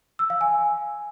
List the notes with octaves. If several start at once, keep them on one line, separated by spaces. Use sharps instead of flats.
E6
F5
G#5